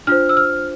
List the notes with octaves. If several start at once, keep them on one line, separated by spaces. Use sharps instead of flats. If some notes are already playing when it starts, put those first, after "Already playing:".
D4 F4 C5 F6
E6
F6